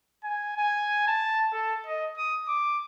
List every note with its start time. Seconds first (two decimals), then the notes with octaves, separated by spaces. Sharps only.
0.24 G#5
0.57 G#5
1.08 A5
1.52 A4
1.86 D#5
2.17 D#6
2.48 D6